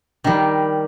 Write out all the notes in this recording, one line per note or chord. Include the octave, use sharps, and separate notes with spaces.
D#3 G3